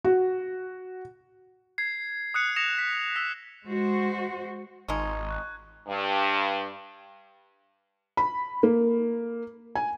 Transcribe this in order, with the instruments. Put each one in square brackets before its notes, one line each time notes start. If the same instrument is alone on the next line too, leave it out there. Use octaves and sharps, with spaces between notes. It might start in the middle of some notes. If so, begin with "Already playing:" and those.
[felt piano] F#4
[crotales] G#6 C7
D#6 F#6 C#7
D#6 A#6 C#7 E7 F7
B6
E6 B6
[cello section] G#3 F#4 C5
[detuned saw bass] G#1 [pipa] F3 G#3 D#4 [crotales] C#6 G#6
[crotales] C#6 F#6
[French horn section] G2
[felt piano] B5
A#3
G#5